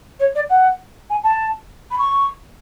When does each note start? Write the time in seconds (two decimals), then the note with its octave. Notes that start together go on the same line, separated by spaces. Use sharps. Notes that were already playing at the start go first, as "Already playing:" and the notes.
0.19 C#5
0.35 D5
0.49 F#5
1.10 G#5
1.23 A5
1.91 B5
1.98 C#6